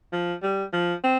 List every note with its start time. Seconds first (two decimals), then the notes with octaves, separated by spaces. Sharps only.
0.13 F3
0.43 G3
0.73 F3
1.04 C4